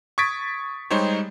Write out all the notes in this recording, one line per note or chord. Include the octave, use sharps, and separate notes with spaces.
C#6 D#6 G#6 A6 B6 D7
G3 G#3 D#4 G4 C5 C#5